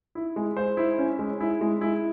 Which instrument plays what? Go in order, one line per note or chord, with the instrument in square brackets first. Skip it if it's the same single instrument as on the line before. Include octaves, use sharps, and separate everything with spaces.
[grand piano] E4
G#3
C5
E4
C#4
G#3
E4
G#3
E4